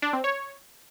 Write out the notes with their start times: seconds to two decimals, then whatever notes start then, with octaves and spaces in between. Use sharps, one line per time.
0.02 D4
0.13 C4
0.24 C#5